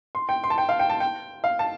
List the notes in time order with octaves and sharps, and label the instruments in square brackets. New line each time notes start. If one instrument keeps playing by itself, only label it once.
[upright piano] C6
G5
C6
A5
G5
F5
G5
A5
G5
F5
A5